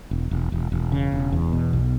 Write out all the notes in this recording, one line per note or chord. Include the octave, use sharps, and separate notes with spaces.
E1
E1
E1
E1
C#3
E1
E2
B2
B1